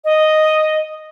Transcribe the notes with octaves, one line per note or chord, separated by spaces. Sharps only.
D#5